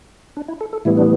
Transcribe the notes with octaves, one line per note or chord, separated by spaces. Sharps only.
D4
E4
A4
A4
A2 E3 G3 B3 E4
D4